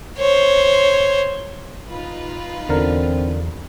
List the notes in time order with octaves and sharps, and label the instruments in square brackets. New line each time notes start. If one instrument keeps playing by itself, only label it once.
[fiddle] C5 C#5
[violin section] D#4 F4 B4
[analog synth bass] E2 [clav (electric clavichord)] D3 A#4 [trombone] C4